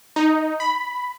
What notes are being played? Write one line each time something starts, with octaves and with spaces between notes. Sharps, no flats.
D#4
B5